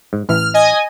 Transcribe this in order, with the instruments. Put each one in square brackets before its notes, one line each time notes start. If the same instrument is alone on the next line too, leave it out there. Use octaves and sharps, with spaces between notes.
[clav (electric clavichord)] G#2
[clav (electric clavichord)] A1 E3 E5 [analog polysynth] F6
[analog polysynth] D#5 G#5